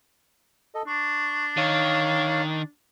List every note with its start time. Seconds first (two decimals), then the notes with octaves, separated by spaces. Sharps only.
0.75 A4 D#5
0.87 D4 C#6
1.57 D#3 C#5 F5